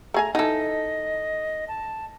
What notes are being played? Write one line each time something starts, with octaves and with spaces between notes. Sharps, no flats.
A3 G#4 G#5 A#5
D3 E3 D#4 A4 D#5
A5